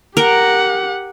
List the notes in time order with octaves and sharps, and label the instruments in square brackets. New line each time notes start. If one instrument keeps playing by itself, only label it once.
[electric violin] G4 F#5 [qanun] A#4